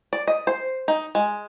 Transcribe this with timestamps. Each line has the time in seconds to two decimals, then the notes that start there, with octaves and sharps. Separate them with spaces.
0.13 D5
0.28 D#5
0.47 C5
0.88 D#4
1.15 G#3